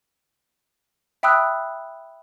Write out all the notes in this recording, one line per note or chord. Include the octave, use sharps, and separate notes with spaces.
E5 G5 B5 D#6 E6 F#6